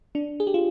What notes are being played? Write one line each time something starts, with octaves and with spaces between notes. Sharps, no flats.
D4
G#4
G4
F4